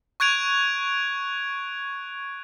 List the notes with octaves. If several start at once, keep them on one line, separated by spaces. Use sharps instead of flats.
C#6 F#6 G#6 D7 F7